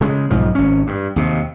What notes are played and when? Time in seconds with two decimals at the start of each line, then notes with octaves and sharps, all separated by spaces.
0.01 C#3 G#3
0.30 B1 G#2 F3
0.55 G#1 C#4
0.87 G2
1.16 D#2 C3